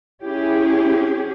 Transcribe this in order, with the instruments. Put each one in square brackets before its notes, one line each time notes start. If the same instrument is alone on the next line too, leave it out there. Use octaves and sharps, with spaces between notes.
[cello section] C#4 G4 G#4 [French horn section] E4